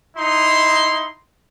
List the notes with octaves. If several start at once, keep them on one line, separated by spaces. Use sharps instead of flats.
D#4 E4 C6